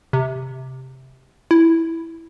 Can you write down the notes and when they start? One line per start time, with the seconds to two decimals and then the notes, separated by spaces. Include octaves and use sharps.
0.13 C3
1.51 E4